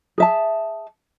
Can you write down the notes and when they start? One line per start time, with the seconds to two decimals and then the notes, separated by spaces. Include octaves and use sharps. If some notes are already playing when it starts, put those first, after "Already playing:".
0.18 G#4 E5 A5